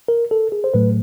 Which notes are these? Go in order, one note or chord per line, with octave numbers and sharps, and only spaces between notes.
A#4
A4
G#4
C5
A2 F#3 A3 B4